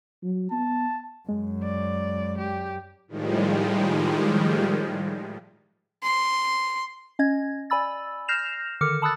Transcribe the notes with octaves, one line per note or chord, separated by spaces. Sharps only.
F#3
B3 A5
F#2 G#3
D5
G4
A2 D#3 F3 G3 G#3
C6
C#4 D#5 G#6
D5 G#5 B5 E6 A6
F6 G6 A#6 C7 E7 F7
D3 D#3 D6 F6 C#7
A5 B5 D#6 E6 F#6 A6